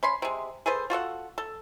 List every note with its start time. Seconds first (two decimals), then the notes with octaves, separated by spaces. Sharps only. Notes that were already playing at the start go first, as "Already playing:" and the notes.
0.03 C#4 B5 C6
0.22 C3 G#3
0.66 G#4 A4 B4 C5
0.90 F4 F#4 A4 F#5
1.38 A4